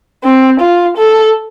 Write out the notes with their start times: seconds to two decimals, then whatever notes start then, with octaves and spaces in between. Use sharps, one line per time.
0.24 C4
0.60 F4
0.97 A4